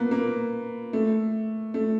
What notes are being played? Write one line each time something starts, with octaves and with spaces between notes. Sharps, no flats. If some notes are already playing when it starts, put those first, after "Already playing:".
Already playing: A#3 B3
A#3
A3
A3